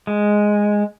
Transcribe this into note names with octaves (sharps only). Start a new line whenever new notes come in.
G#3